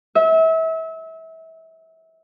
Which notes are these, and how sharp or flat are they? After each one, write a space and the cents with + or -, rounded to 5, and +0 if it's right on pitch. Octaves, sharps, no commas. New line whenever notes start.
E5 -30